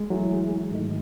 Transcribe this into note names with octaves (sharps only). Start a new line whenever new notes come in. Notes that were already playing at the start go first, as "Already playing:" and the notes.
Already playing: G#3
E3 F#3 A3 E4 G#4
G#2 D#3 A3 D#4